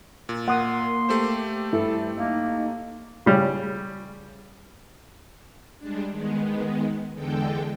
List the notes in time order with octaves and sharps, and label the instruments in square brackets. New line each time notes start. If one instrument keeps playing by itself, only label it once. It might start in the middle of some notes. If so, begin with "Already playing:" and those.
[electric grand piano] A#2
[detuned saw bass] A#3 [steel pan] F#5 D#6 [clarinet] C6
[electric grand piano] A3 G4 C5
[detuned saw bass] G2 [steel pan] E4 [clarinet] A4
[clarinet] A#3 [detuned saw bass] D#4
[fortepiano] C#3 G3
[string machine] G3 G#3 D4
D#3 G#3 B3
E2 D3 G#3 A4 G5